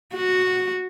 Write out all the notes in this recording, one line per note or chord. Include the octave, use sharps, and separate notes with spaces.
F#4